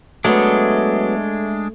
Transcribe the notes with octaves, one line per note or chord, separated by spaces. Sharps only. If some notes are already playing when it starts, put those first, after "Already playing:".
F#3 G#3 A3 B3 D4